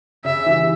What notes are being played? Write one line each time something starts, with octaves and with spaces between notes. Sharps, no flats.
C#3 E5
E3 G3